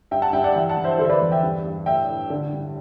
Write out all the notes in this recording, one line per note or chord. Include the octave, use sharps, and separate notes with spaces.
G2 E5 G5
F#5 A5
G2 E5 G5
D5 F#5
E3 E5 G5
F#5 A5
E3
C5 E5
D3 A4 C5
E5
B4 D5
E2
E5 G5
G2
G2
A2 E5 G5
A2
D3
G2